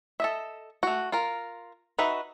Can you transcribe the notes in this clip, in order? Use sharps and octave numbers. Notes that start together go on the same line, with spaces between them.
A4 D#5 E5
A3 F#4
F4 A#4
D#4 F#4 B4 E5